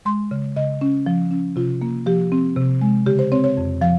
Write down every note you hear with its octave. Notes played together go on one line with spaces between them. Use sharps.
G#3 C6
C#3
C#3 D#5
C#4
F3
C#4
C3 F4
A#3
F3 G4
C4
C3
G#3
C#3 G4
C5
C4 C#5
C#5
F2
F3 F5